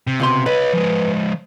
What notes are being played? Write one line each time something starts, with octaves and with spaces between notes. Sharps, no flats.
C3
C#2 B2 C6
B4 C#5 D#5
F3 G#3